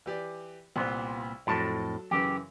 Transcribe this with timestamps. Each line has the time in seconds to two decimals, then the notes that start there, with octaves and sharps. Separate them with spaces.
0.06 E3 G4 D5
0.76 C2 A#2 B3 C5
1.47 F2 A2 F#3 A4 A5
2.11 F#2 C#3 E3 G4